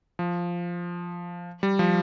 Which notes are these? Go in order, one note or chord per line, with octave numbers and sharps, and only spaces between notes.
F3
G3
F3